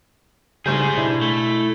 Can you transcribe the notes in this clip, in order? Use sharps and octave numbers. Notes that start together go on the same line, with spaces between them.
G#1 G#2 C#3 G3 G#4 C5 G6
B2 D4 E4
A3